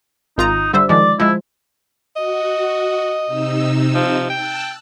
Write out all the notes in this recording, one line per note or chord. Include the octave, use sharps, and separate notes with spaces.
G#1 D#4 F4 A#5
D3 G3 C5 E5
D#3 F3 G#3 D5
F3 G#3 E4
F#4 D#5
C3 D#4 E6
F3
G5 A5 E6 F#6